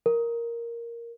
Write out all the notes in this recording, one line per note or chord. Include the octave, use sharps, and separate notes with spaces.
A#4